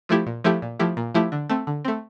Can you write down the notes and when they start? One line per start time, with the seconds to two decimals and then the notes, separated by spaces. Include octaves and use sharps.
0.09 F3 A3 E4 G4
0.27 A#2
0.44 F3 A3 E4 G4
0.62 A#2
0.79 F3 A3 E4 G4
0.97 A#2
1.14 F3 A3 E4 G4
1.32 D3
1.50 A3 C4
1.67 D3
1.85 A3 C4